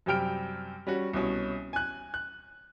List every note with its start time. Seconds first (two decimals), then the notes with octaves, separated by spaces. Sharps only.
0.06 F#2 C3 G3 G5 F6 D7
0.87 G3 C#4 F#4
1.13 C2 B2 C#4
1.73 G#5 F#6
2.14 F#6